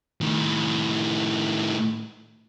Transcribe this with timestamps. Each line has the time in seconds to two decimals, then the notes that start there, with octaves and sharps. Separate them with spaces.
0.21 A2 D#3